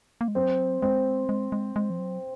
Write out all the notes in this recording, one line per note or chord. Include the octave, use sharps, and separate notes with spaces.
A#3
G#3
F#3 C4
G#3 C4
G#3
G#3
G#3
F3
F#3